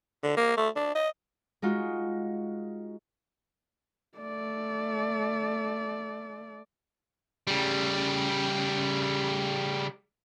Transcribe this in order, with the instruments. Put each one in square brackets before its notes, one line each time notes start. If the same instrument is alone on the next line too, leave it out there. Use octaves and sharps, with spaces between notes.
[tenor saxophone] D3
A#3
A3
D4
D#5
[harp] G#3 D#4 F4 F#4
[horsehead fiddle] A3 D5
[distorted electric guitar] C#3 G3